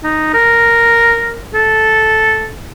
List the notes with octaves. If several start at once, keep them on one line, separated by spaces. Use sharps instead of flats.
D#4
A#4
A4